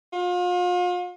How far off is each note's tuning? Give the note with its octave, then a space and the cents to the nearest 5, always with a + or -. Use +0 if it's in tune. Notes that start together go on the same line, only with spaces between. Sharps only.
F4 +40